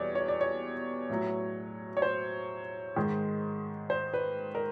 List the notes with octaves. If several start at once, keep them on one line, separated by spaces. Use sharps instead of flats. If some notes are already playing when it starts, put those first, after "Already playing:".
Already playing: E2 B2 G3 C#5 D5
C#5
D5
C#5
A2 F#3
C#5
C5
G#2 D#3 G#3
C5
B4
A#4